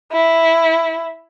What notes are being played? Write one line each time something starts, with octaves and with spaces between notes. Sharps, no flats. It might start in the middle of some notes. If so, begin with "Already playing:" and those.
E4